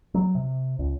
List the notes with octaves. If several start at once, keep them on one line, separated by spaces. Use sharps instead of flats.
F#3
C3
C#2